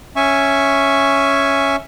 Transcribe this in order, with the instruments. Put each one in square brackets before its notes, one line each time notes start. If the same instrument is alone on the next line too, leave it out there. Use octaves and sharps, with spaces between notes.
[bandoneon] C#4 E5 G#5 C#6